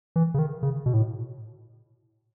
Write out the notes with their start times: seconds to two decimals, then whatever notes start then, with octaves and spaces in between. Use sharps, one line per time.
0.16 E3
0.34 C#3
0.39 D#3
0.63 C#3
0.86 B2
0.93 A2